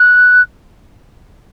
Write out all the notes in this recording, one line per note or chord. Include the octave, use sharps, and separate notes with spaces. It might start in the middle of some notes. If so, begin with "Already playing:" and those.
Already playing: F#6